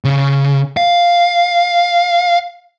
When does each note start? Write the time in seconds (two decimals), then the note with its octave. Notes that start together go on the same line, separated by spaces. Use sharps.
0.05 C#3
0.77 F5